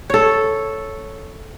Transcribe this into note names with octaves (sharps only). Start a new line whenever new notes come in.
A4 C#5